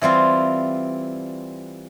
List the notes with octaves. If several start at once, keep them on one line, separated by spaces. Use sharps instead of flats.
E3 G3 C4 F4